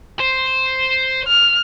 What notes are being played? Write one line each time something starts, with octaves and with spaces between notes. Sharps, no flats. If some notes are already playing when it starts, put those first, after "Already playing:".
C5
F6